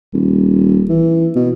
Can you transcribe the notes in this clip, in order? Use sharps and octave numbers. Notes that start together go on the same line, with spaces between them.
D#1
E3
B2